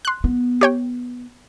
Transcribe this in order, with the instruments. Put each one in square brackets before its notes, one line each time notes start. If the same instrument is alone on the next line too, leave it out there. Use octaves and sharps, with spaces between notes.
[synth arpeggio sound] C6 F#6
[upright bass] B3
[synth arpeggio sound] G4 C#5 G5